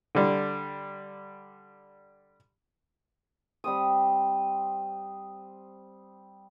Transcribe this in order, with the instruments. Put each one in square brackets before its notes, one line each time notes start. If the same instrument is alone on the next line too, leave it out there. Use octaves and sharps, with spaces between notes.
[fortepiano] D3 G3
[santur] G3 C4 D#6